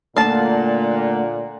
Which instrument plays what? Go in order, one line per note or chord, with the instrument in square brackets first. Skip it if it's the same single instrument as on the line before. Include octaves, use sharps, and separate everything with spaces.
[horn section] A#2 [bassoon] D3 [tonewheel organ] A3 A#3 F#5 [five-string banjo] F5 A5